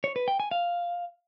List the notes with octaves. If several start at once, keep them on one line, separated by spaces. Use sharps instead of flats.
C#5
B4
G5
G#5
F5